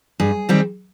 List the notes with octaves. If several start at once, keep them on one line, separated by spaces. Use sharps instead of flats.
G2 G#4
D#3 G3 C4